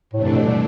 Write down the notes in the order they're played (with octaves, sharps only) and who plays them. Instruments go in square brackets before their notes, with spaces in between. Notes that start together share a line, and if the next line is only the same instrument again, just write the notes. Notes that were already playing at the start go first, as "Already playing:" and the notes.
[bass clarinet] A2 [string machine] C3 E3 A3 D4
[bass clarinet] G2
A2
B2
G3